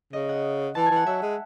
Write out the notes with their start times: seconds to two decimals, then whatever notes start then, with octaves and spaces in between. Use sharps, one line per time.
0.13 C#3 D#5
0.29 F#5
0.75 E3 A5
0.86 E3 G#5
0.96 F#5
1.06 F#3 E5
1.22 G#3